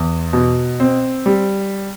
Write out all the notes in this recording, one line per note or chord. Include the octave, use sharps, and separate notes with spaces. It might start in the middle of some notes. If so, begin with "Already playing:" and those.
Already playing: E2
B2
C4
G3